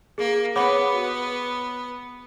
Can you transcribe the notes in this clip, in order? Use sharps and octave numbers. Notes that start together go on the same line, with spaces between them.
A#3 G#4
B3 C#5 F#5 B5 D6
F#4